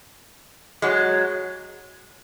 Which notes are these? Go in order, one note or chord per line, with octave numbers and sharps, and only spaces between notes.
F#3 G#3